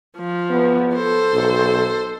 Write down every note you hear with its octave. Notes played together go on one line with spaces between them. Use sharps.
F3
B3
A4 C5
B1